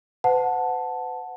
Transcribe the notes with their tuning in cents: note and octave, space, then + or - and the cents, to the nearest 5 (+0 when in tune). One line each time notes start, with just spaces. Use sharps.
B4 +45 F#5 -10 A5 +0